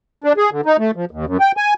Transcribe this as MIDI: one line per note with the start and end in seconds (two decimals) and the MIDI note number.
0.24 0.33 62
0.37 0.50 68
0.52 0.61 50
0.66 0.77 63
0.79 0.91 57
0.96 1.05 53
1.11 1.25 39
1.26 1.37 42
1.40 1.52 79
1.57 1.74 80